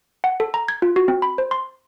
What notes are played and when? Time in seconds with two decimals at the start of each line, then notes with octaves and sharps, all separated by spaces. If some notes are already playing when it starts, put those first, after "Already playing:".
0.24 F#5
0.40 A4
0.54 A#5
0.68 G#6
0.82 F4
0.96 F#4
1.08 C4
1.22 B5
1.38 C5
1.51 C6